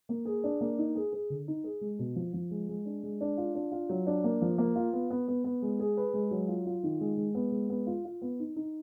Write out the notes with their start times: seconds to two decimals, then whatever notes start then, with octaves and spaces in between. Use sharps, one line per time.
0.09 A#3
0.25 G#4
0.44 D4
0.61 A#3
0.79 D#4
0.96 G#4
1.13 G#4
1.30 D3
1.48 D#4
1.64 G#4
1.81 G#3
1.99 B2
2.16 F3
2.33 F3
2.51 G#3
2.69 G#3
2.85 D4
3.03 G#3
3.21 D4
3.38 F4
3.55 D4
3.72 F4
3.89 F#3
4.07 D4
4.24 A#3
4.42 F3
4.58 A#3
4.76 F4
4.93 B3
5.10 B3
5.28 B3
5.44 B3
5.62 G#3
5.79 G#4
5.97 B4
6.13 G#3
6.31 F#3
6.48 F4
6.66 F4
6.83 D#3
7.00 G#3
7.17 G#3
7.35 B3
7.52 G#3
7.70 B3
7.87 F4
8.05 F4
8.22 B3
8.40 D#4
8.56 D#4